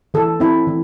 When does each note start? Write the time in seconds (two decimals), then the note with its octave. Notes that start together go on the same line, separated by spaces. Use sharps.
0.14 E3 A4
0.40 C4 E4
0.67 E3